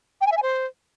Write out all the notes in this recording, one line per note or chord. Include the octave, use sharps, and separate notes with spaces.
G5
G#5
E5
G#5
C5